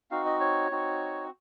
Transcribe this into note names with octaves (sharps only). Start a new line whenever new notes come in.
C4 D#4 F#4 F5
D#5
C#5
C4 D#4 F#4